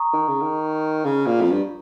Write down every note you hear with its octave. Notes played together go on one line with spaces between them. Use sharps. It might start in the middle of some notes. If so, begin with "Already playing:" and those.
Already playing: A#5 C#6 D#6
D#3
C#3
D#3
C#3
A#2
F2
G2